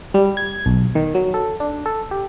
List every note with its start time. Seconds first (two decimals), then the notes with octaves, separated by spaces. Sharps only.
0.14 G3
0.37 G#6
0.66 B1
0.95 D#3
1.15 F#3
1.34 A4
1.60 D4
1.86 A4
2.11 G4